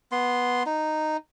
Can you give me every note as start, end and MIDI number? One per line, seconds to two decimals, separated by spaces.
0.12 0.63 59
0.12 0.63 84
0.66 1.17 63